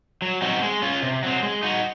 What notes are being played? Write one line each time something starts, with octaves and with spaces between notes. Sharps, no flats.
F#3
C4 D#4 F#4
G#3
C#4 F4
C3
F#3 C4
G#3
D#4 F#4